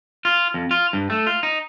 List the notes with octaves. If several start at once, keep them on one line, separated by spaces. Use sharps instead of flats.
F4
F2
F4
G2
A3
F4
D#4